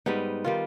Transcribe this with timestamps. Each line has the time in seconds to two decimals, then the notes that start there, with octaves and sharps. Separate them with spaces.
0.06 G#2 G3 B3 D#4
0.44 D#3 G3 F4